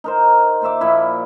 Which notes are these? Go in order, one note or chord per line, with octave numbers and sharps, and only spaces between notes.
D#4 A#4 C5
A#2 C5 E5 D6
A#2 F3 E4 B5